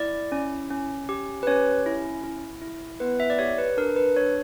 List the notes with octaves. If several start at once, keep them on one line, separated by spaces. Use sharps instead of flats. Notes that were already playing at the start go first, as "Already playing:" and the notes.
Already playing: E4 D5
C#4
C#4
G4
B4
C#4 C#5
E4
E4
E4
B3 B4
E5
D5
G4 C#5
B4
D4 A#4
B4
D4 C#5